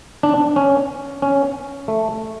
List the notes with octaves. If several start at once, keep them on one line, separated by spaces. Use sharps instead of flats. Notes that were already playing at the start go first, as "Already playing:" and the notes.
D4
C#4
C#4
A3